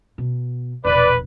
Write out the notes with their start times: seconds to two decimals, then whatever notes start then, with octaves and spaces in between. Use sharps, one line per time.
0.18 B2
0.85 E1 A#1 B4 D5